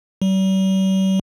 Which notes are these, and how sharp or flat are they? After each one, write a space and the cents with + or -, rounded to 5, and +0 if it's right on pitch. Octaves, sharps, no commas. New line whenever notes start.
G3 -45